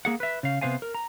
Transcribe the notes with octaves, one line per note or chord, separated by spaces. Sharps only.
A#3 G#4 F#5
B4 E5
C#3 F5
C3 B3 C5 F5 G#5
A#4
A#5